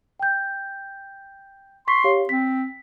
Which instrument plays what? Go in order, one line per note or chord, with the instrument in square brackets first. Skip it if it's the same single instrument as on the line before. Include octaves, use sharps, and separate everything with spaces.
[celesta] G5 G6
[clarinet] C6 [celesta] C#6 B6
[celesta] G4 C#5 F5
[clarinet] C4 [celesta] B6